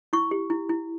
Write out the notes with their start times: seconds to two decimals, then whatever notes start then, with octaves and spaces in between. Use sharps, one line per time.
0.13 E4 C#6
0.31 G4
0.50 E4
0.69 E4